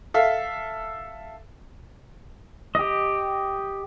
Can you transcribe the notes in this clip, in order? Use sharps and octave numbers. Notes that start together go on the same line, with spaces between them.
A4 E5 F5
G4 D#5